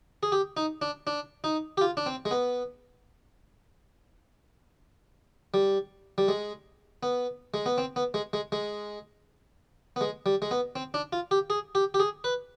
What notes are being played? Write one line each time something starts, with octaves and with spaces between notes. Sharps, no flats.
G#4
G4
D#4
D4
D4
D#4
G4
F4
D4
C4
G#3
B3
G3
G3
G#3
B3
G#3
B3
C4
B3
G#3
G#3
G#3
B3
G#3
G3
G#3
B3
C4
D4
F4
G4
G#4
G4
G4
G#4
B4